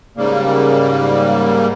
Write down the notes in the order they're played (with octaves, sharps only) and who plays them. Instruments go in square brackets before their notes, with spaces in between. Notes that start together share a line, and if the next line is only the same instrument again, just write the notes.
[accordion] G#2 C#3 G3 A#3